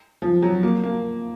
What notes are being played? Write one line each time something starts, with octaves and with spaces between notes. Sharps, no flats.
F3
F#3
A#3
A#3